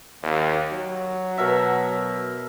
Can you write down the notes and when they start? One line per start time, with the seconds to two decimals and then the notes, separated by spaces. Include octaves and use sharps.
0.23 D#2
0.72 F#3
1.38 B2 A#4 E5